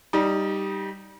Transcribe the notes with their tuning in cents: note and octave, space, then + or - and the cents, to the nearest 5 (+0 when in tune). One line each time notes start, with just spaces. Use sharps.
G3 +0 D#4 +0 B5 -40